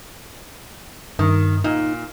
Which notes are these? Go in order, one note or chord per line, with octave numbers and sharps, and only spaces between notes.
G2 D#3
A#2 D#4